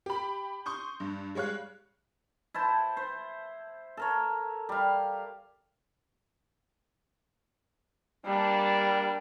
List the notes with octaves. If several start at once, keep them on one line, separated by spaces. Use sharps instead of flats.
G4 B5
C6 C#6 D#6 G6
G2
G3 G#3 C#5 F5 F#6
E4 C5 A5
C5
A4 A#4 C#5
G3 F5
G3 A#3 D4